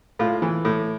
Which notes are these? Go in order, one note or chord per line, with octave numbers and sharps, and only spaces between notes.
A2 F4
E3
A2